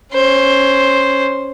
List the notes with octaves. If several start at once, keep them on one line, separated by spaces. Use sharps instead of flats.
C#4 C5